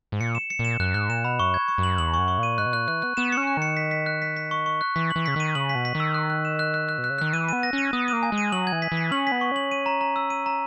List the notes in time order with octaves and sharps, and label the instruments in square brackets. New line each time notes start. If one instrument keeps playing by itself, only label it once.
[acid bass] G#2
[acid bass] A#2 [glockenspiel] C#7
[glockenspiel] E7
C#7
[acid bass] A#2
[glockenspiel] E7
[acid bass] F#2 [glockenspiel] F#6
[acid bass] G#2 [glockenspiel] F#6
[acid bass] A#2 [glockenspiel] E7
[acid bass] B2 [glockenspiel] B5
[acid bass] F#2 [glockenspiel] C#6
[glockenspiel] G#6
C#6
[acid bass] F#2
[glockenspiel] F#7
[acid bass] E2 [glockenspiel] F#7
[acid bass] F#2 [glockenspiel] C#6
[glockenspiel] C#6
[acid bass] A#2
[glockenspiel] D#7
[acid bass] G#2 [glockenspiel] F#6
[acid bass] B2
[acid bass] A#2 [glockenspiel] F#6
[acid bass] E3 [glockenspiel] F#6
[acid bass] B3 [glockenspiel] F#6
[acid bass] B3 [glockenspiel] E7
[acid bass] C#4 [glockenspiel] C#7
[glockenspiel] F#6
[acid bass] D#3 [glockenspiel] C#7
[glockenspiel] B6
B6
F#6
B6
B6
C#6
C#6
F#6
[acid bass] E3 [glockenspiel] B6
[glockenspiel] F#7
[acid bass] E3
[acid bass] C#3 [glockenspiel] B6
[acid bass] D#3 [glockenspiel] D#7
[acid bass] C#3 [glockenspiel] F#7
[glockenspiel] B6
[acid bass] B2
[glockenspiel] B6
[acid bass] D#3
[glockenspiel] E6
F#6
F#6
E7
F#6
F#6
F#6
[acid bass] B2
[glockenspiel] F#6
[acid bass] C#3
[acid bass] D#3 [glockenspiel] F#6
[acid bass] E3 [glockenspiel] D#7
[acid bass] B3 [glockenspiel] D#7
[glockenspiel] A#6
[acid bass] C#4 [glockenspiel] D#7
[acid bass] B3 [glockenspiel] D#6
[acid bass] A#3 [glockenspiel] D#7
[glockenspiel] G#5
[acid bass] G#3
[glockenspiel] D#7
[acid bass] F#3 [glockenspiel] F#7
[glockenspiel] G#6
[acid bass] E3
[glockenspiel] B6
[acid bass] E3
[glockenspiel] B6
[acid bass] C#4 [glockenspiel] F#7
[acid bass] B3 [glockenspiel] B6
[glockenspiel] C#6
[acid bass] C#4 [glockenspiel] F#7
[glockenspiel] D#7
A#5
A#5
E6
D#7
A#5